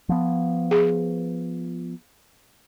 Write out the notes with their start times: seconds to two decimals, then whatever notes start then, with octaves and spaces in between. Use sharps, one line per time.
0.09 F3 B3
0.71 G#4